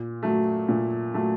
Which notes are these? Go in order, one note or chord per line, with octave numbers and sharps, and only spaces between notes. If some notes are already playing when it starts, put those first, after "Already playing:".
Already playing: A#2
F#3 A3
A#2
F#3 A3